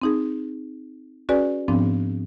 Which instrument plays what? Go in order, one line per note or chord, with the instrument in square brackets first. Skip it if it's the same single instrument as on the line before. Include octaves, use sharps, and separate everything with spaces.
[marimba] C4 D#4 G#4
C#4 F#4 G#4 B4 D5 G#5
G#2 F3 B3 C4 D4